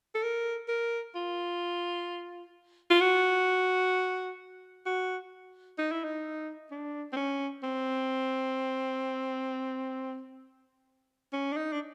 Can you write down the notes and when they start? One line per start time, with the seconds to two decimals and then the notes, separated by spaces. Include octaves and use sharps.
0.15 A4
0.24 A#4
0.69 A#4
1.15 F4
2.90 F4
3.01 F#4
4.86 F#4
5.79 D#4
5.92 E4
6.04 D#4
6.71 D4
7.13 C4
7.17 C#4
7.64 C4
11.33 C#4
11.53 D4
11.57 D#4
11.73 D4